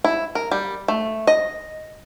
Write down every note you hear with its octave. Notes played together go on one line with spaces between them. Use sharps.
E4
A#4
G3
A3
D#5